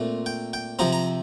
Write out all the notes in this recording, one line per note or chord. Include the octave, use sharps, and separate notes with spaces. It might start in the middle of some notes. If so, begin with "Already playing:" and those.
Already playing: A#2 A3 C4
G5
G5
C3 F3 C4 A#5
A#5